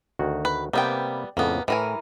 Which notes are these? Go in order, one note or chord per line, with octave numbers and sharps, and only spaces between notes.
D2 D#3 F#4
B4
C3 G3 A#3 B3 G5
F2 A2 C#3 A#3 B3
A2 E3 A#4 G#5